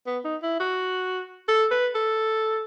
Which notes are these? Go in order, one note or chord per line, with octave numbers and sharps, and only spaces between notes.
B3
D#4
E4
F#4
A4
B4
A4